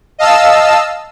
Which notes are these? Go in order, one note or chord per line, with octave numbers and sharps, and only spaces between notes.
D#5 F5 A5 E6